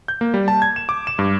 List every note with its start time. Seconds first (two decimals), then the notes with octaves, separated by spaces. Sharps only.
0.08 G6
0.21 A#3
0.34 G3
0.48 A5
0.62 G#6
0.76 E7
0.89 D6
1.07 E7
1.19 G2